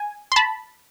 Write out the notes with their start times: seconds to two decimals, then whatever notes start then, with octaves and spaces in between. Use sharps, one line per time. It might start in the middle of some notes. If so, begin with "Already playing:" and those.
Already playing: G#5
0.32 C6
0.36 A5 B5